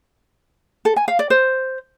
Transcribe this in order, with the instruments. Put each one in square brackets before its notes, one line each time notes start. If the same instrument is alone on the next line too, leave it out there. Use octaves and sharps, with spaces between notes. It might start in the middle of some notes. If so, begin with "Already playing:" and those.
[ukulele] A4
G#5
F5
D5
C5